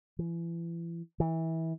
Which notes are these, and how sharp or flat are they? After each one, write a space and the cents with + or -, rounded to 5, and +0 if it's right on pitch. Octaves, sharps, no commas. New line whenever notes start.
E3 +35
E3 -25